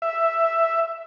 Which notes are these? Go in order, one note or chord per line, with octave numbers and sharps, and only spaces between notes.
E5